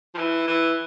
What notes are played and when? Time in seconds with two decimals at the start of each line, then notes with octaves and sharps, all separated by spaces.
0.14 F3
0.19 E3
0.48 E3